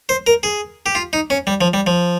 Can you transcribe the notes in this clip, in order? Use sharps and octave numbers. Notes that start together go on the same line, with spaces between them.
C5
A#4
G#4
G4
F4
D#4
C#4
G3
F3
G3
F3